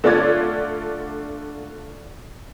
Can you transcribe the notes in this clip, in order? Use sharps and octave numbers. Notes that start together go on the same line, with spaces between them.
D3 A3 D4 F4 D5 G#6